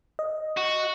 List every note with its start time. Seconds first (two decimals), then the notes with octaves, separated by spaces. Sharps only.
0.19 D#5
0.57 F#4